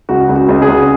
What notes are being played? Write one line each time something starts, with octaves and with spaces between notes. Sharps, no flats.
C#2 F#4
C#2
F#4
C#2
G#4
C#2